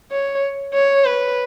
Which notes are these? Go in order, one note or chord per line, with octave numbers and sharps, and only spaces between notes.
C#5
C#5
B4